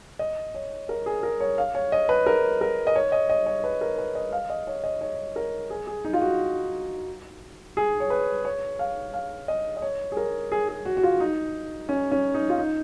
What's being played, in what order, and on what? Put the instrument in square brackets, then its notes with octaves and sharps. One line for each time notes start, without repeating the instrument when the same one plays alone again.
[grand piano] D#5
C#5
A#4
G#4
A#4
C#5
F5
C#5
D#5
B4
A#4
A#4
D#5
C#5
D#5
D#5
C#5
B4
A#4
B4
D#5
F5
D#5
C#5
D#5
C#5
A#4
G#4
G#4
D#4
F4
F#4
G#4
C#5
B4
C#5
F5
F5
D#5
D#5
C#5
G#4
A#4
G#4
G#4
F#4
F#4
F4
D#4
C#4
C#4
D#4
F4
D#4